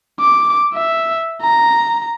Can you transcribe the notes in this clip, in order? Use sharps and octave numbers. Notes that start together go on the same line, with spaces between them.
D6
E5
A#5